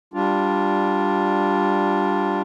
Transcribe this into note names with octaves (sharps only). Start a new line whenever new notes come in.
G3 D4 F4